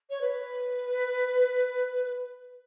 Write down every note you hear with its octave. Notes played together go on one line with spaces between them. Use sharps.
C#5
B4